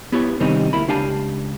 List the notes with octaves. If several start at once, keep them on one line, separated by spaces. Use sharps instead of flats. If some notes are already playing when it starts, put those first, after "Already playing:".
B3 E4 G4 B4 C#5
C3 D#3 G3 C4 C#4 D#4
D2 A#3 E4 B5
C#2 D4 G4 F5 G#5 A5